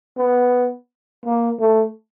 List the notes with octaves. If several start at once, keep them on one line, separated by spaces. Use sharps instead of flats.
B3
A#3
A3